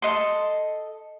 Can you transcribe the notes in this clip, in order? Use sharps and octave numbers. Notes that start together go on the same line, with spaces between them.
A4 D#5 C6